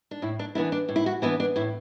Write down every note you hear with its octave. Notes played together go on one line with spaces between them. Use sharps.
D4
A2 E4
D4
E3 B3 D4 E4
D4
A2
E4
F#4
E3 B3 D4 E4
D4
A2 E4